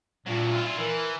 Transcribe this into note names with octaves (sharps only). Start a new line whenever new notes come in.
G2 A#2 F#3
E4 F4
E3 A#4